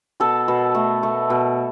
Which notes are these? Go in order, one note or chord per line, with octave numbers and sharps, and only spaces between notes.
B2 A4
B2
A3
A3
B2